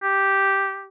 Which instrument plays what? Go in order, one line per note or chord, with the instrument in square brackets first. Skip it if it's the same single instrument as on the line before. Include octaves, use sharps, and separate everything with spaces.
[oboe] G4